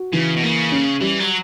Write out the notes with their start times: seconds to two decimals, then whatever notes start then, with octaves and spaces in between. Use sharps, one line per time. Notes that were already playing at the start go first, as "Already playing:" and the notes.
Already playing: F#4
0.13 C#3 E3
0.36 B2
0.42 C#3 A#3
0.72 C#4
1.01 E3 G3
1.20 F#3